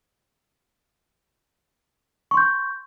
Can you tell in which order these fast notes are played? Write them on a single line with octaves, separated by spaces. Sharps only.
C#6 C6 G6